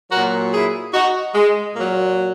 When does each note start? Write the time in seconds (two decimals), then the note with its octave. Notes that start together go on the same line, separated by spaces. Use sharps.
0.11 A#2 F#3 F#4 A#4
0.53 E4 G#4
0.93 D#4 F#4
1.35 G#3
1.75 A#2 F#3 A#3